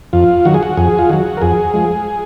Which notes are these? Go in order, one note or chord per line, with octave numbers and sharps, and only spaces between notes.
F2 F4
D#3 F#3 F#4
G#4
F#4
F2 G#4
F4
D#3 F#3 F#4
A#4
F2 G#4
F3 G#3